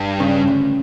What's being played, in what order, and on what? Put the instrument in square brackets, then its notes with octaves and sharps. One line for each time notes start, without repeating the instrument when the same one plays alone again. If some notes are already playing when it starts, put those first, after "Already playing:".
Already playing: [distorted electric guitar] G2
[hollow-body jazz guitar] C#3
D2